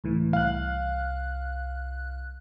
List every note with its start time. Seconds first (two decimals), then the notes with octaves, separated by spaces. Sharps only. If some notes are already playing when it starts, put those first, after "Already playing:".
0.04 C#2 A2 E3
0.33 C2 F5 F#6